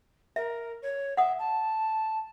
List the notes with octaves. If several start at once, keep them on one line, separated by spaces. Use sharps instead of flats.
A#4 E5
C#5
E5 F#5 D#6
A5